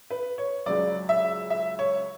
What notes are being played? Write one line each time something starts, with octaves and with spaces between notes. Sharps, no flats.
B4
C#5
C#2 C#3 F#3 D5
E5
E5
C#5